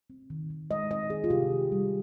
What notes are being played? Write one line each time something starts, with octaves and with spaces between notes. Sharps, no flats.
C4
D#3
D#3
G#3 D#5
C4 D#5
D#3 G#4
F4
C3 G4
D#3
G3